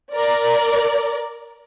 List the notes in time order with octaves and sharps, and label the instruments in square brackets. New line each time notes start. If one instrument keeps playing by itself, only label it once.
[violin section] A#4 D5